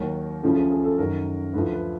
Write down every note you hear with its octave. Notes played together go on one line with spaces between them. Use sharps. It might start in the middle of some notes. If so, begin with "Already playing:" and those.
Already playing: D#2 D#3 F#3 A#4
D2 C#3 F3 A4
G#4
G#4
A4
F#2 D#3 F#3 A#4
D2 D3 F3 B4
B4